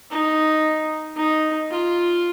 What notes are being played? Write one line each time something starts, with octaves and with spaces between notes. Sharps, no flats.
D#4
D#4
F4